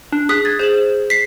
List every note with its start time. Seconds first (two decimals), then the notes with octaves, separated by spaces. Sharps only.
0.12 D4
0.29 G#4 D#6 F#6 B6
0.45 G#6 A6
0.59 G#4 C5 E7 F#7
1.10 B6 C7